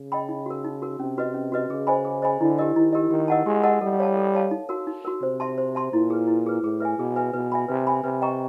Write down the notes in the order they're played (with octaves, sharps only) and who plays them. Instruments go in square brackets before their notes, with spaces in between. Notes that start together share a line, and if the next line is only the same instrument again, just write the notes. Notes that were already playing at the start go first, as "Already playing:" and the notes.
Already playing: [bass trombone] C#3
[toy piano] D#5 G5 B5
D#4
F#4 A#4
D#4
F#4 A#4
[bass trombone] C3 [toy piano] C#4
[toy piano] F#4 B4 D#5
C#4
F#4 B4 D#5
[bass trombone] C#3 [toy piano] G#4
[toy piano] C5 D#5 G#5 B5
G#4
C5 D#5 G#5 B5
[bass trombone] D3 [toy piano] E4
[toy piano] G4 A#4 D#5
[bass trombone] D#3 [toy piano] E4
[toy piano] G4 A#4 D#5
[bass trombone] D#3 [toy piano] G4
[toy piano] A#4 D#5 F#5 A5
[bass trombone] G#3 [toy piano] G4
[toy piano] A#4 D#5 F#5 A5
[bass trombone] G3 [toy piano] A4
[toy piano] C#5 F5 A5
A4
C#5 F5 A5
D#4
F#4 A#4
D#4
F#4 A#4
[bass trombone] C3 [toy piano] C5
[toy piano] E5 A5 C6
C5
E5 A5 C6
[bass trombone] A#2 [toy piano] E4
[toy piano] G#4 B4
E4
G#4 B4
[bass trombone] A2 [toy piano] G#4
[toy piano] B4 E5 G#5
[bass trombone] B2 [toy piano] G#4
[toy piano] B4 E5 G#5
[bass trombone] B2 [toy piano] B4
[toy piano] E5 G#5 B5
[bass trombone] C3 [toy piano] B4
[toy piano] E5 G#5 B5
[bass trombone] C3 [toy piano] B4
[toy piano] D#5 G5 A#5 C#6